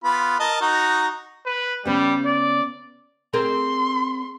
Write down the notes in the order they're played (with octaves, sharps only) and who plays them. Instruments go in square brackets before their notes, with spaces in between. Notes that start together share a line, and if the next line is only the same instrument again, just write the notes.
[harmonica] B3 F4 B5
A#4 D#5 A5
D#4 F#4 A#5
[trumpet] B4
[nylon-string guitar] C#3 B3 [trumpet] G3
[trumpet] D5
[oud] C4 G#4 A#4 [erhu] C6